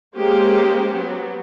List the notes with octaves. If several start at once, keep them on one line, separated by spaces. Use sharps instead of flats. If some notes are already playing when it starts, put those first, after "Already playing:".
G#3 A#3 C#4 G4 C5
F#3 B3